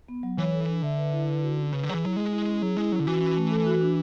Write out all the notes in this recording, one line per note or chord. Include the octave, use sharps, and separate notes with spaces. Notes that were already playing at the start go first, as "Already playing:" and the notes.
B3
F#3
E3 C#5
A4
D4
D3 E5
B4
E4
B4
F#4
C#4
C#3 B4
D3
F#3 G#4
E3
F#3 E4
G#3 G#4
E4
C#4
F#3 G#4
G#3 E4
F#3 C#4
D3
E3 F#4
C#4
A3
A4
F#4
D4